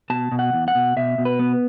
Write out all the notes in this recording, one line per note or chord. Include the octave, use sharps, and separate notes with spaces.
B2 A5
B2
F#5
E2
F#5
B2
B2 E5
B2
B4
B3